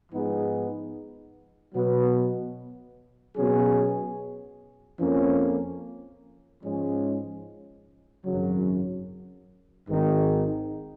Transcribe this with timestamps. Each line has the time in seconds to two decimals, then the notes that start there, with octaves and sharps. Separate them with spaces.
0.11 G#2 F3 B3 D#4 G#4
1.74 B2 F#3 B3
3.37 B2 F#3 C#4 G#4
5.00 F2 F3 A#3 C#4
6.63 G#2 F3 G#3 C#4
8.26 G#1 F#2 C#3 F#3
9.89 G#1 G#2 D#3 G#3 D#4